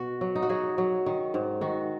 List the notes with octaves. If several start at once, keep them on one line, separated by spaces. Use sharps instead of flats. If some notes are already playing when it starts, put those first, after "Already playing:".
Already playing: B2 F#4
F#3
D#4
F#4
F#3 G#4
F#3
D#3
G#2
D#3 F#4